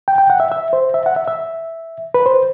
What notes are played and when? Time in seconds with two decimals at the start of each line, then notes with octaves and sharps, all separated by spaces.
0.08 G5
0.18 G5
0.30 F#5
0.40 E5
0.52 E5
0.73 C5
0.94 E5
1.06 F#5
1.16 E5
1.28 E5
2.14 B4
2.26 C5